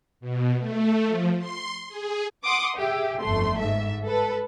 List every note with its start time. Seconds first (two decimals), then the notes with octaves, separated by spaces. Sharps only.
0.20 B2
0.59 A3
1.06 F3
1.39 C6
1.88 G#4
2.44 F#5 C6 D6 D#6
2.77 G4 G#4 E5
3.21 G1 F2 A3 C6
3.58 G#2 E5
4.05 A4 B4